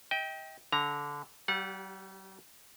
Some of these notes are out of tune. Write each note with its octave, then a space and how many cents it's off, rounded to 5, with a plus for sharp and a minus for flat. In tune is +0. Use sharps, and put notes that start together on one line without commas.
D#5 +40 G5 +0
D3 -20 A#5 +0
G3 -40 G4 +0 F#5 -35